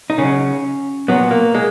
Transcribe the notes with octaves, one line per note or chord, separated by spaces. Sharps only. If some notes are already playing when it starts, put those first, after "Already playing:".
D#4
C#3 F#3 C#4
A#2 F#3 B3
A#3
G#3